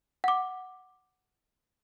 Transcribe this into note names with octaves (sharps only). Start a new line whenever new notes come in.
F#5 D6